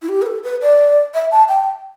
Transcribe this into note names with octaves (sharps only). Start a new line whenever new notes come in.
E4
G4
B4
A4
B4
D5
E5
A5
G5